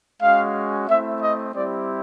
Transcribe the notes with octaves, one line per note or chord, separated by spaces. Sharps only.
G#3 C#4 F#4 F5
A3 C4 E4 E5
D#5
G3 C4 E4 G4 D5